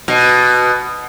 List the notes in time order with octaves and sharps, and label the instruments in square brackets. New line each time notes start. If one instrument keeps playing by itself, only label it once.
[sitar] B2